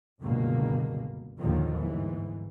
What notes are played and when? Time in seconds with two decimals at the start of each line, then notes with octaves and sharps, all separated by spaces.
0.21 F#1 C#2 G2 B2 D3 A#3
1.39 A#1 D#2 G#2 D3 D#3 F3
1.77 G1 G#2 E3